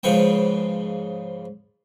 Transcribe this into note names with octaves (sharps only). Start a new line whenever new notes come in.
G#2 C#3 F3 B4 C#5 G5